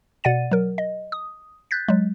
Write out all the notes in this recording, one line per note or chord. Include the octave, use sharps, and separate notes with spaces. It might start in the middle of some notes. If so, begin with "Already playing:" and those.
B2 D5 F#5 A6 D#7
F#3 A#4
D#5
D#6
F#6 G6 A6 B6
F#3 G#3